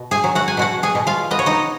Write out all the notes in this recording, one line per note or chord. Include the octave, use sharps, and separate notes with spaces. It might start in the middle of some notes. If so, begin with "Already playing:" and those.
Already playing: B2
G#4 G#5
F#3
F#4 F#5
G#5
B2 F#4 F#5
G#4 G#5
B2
F4 F5
B3 D#5
C#5
D#4 D#5